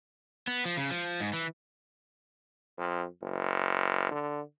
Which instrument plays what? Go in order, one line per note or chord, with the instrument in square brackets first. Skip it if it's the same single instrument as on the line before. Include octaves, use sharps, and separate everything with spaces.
[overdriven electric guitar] B3
F3
C#3
F3
G#2
E3
[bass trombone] F2
F#1
D3